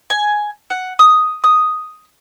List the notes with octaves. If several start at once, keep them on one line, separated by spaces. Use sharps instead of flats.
G#5
F#5
D#6
D#6